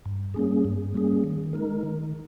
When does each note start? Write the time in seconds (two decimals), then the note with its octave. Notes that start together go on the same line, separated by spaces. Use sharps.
0.06 G2
0.34 G3 A#3 C#4 G#4
0.65 G2
0.94 G3 A#3 C#4 G#4
1.24 D#3
1.53 G#3 D#4 A#4
1.84 D#3